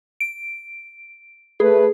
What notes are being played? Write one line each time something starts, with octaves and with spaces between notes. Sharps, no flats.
D7
A3 G#4 B4